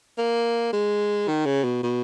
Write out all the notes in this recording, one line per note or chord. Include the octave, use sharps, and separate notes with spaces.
A#3
G#3
D#3
C#3
B2
B2